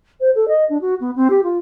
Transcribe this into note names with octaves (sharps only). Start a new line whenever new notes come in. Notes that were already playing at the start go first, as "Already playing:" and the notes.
C5
A4
D#5
D4
F#4
B3
C4
G4
F4